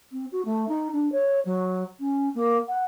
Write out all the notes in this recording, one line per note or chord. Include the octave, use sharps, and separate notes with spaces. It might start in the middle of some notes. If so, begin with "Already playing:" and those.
C4
F#4
A3
D#4
D4
C#5
F#3
C#4
A#3
F#5